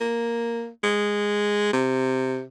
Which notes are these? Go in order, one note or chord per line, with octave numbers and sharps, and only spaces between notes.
A#3
G#3
C3